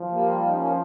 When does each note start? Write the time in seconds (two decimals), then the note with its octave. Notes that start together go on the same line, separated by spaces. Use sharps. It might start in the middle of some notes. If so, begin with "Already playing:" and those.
Already playing: F3
0.12 G3 A#3
0.45 D#4
0.53 A#3 C#4